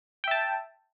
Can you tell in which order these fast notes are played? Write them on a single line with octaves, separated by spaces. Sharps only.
G5 E5 A5